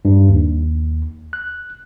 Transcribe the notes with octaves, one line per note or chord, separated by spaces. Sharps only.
G2
D#2
F#6